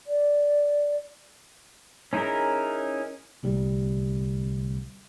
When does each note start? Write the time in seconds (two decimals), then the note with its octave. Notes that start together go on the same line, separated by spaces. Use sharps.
0.06 D5
2.13 C#4 D#4 E4 G#4 A#4
3.43 D1 C2 G3